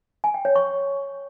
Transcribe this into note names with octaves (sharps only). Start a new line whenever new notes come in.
G#5
G5
C#5
C#6